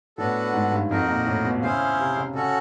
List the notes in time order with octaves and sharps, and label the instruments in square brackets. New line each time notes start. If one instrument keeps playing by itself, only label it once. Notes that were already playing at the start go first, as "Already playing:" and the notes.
[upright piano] A2 [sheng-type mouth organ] B3 D4 F#4 A4
[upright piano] G#2
G2
[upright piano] F2 [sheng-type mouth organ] D#4 F#4 A#4
[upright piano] A#2
A2
B2
[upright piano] C#3 [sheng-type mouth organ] C#4 E4 G#4 C5 F5
[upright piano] C3
C#3
[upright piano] C#3 [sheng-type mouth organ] C#4 F#4 A4